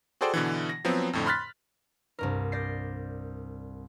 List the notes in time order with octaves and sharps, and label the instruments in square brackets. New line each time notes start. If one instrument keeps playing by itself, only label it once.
[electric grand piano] F#4 G#4 A4 C5 D5 G5
B2 D3 E3
A#6
F3 F#3 B3 C4
F2 A2 D3
B5 C6 F6 F#6 A6 B6
[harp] C2 G2 A#4
D5 G6 A#6 C7